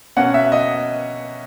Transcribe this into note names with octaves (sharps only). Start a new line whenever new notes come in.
B2 A#3 C#4 F#5
E5
D#5